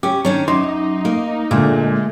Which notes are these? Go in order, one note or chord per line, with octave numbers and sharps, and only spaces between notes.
C#4 G4
D#3 C#4 D4 C#5
F#2 D#4 C6 D6
A#3
A#2 D3 G#3 A3